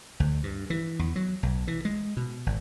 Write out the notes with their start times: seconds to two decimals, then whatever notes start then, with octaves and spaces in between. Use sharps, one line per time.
0.20 D2
0.43 G2
0.70 E3
0.99 E2
1.16 F#3
1.43 B1
1.67 E3
1.85 G#3
2.17 B2
2.46 G#1